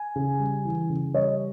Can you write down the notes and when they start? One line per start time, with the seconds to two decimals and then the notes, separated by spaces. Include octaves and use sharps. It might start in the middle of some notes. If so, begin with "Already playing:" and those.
Already playing: G#5
0.16 C#3
0.40 G3
0.65 E3
0.89 C#3
1.14 G3 C#5 D#5